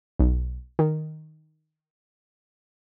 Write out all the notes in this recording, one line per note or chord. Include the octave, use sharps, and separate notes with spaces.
B1
D#3